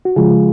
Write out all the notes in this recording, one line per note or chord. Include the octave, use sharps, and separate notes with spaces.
F#4
C#3 F3 G#3 F4 G#4